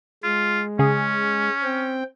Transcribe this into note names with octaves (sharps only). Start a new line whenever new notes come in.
G#3 F4
C#3 C#4 G#4
C4 G5